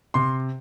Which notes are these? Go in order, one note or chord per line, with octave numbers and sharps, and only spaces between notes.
C3 C6